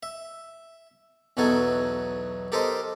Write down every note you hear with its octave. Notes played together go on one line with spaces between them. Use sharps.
E5
B1 E2 F#3 D#4 A4 G#5
G4 A4 A#4 C5 D#5